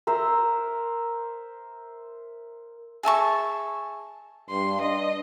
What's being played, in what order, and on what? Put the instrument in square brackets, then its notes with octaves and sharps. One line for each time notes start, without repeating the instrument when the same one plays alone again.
[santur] A#4 C5 E5 A#5
[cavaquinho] G#4 E5 A5 C#6
[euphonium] G2 [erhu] C6
[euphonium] D4 [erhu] D#5